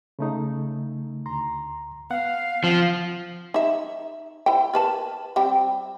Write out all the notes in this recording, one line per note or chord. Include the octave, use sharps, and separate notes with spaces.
C#3 A3 D#4
D2 A#5 C6
B3 F5 F#5
F3 C4
D#4 E5
E4 C5 G5
A#4 B4 A5
G3 C4 G5